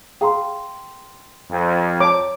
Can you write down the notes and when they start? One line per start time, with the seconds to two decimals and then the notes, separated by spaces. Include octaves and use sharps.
0.21 G#4 F5 G5 A#5 C6
1.49 F2
2.00 C#5 A5 A#5 D6